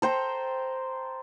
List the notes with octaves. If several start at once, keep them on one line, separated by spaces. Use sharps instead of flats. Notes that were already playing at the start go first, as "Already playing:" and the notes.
A4 C5 G5 A#5